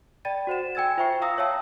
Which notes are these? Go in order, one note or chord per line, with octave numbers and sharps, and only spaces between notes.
D5 G5 B5 A6 D#7
F#4 C5 F#5 E7
G5 G#5 E6 G#6 A6
F4 C5 E5 G5 C#6 C7
F5 A#5 D#6 E6 A#6
C#5 E5 F5 G5 A5 E6